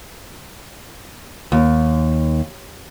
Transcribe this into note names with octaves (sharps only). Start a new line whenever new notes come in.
D#2